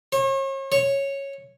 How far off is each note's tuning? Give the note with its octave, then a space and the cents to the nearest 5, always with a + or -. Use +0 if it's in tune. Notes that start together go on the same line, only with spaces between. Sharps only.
C#5 -40
C#5 -5